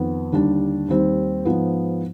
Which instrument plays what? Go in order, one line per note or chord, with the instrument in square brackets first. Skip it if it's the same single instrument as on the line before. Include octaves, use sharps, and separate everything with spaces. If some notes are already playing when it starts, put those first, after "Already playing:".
Already playing: [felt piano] F2 D#3 B3
D#2 D3 G3 D4
D#2 D#3 G3 C4
G#2 F3 B3